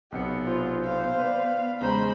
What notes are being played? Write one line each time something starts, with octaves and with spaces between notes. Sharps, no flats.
B1 C3 B3 C#7
F4 C5
B3 F5
B4 D5
E2 C#3 G#3 C5 A#5 B5